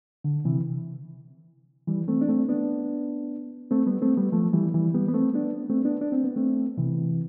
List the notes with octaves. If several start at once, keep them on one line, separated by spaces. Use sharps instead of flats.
D3
C3 E3
E3 G3
A3 C4
D4
A3 C4
B3 D4
A3 C4
G3 B3
A3 C4
G3 B3
F3 A3
E3 G3
E3 G3
G3 B3
B3
A3 C4
B3 D4
A3 C4
B3 D4
D4
C4
B3
A3 C4
C3 E3